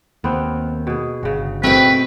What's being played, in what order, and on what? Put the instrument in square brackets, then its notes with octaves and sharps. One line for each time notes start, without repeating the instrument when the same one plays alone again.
[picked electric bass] D#2 [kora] B3 C4
[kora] B2 G#4
[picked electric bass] G1 [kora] C#3 F#4
[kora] B2 A3 [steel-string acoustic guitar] C4 A4 G5 [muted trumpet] B4